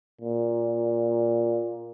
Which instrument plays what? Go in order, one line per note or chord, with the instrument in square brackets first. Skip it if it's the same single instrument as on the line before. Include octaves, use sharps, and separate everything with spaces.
[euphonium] A#2